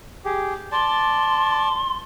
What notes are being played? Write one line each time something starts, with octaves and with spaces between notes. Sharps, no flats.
G4 G#4
D5 A5 C6